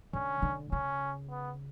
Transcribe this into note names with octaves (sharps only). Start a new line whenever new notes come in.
D3 C#4
D3
C#3 C#4
B3